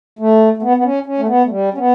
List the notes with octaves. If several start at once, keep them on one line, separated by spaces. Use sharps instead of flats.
A3
A3
B3
B3
C#4
C#4
A3
B3
A3
G3
C#4
B3